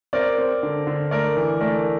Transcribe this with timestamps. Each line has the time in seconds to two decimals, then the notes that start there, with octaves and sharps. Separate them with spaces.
0.13 C4 A#4 D5
0.38 C4
0.63 D3
0.87 D3
1.11 A3 A#4 D5
1.37 E3
1.60 A3 A#4 D5